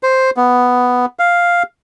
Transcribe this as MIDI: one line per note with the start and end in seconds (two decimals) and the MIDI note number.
0.03 0.31 72
0.37 1.06 59
1.19 1.63 77